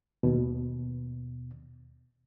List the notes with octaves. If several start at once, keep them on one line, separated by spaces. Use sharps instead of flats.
D#2 B2